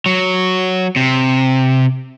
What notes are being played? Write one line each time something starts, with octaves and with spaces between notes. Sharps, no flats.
F#3
C3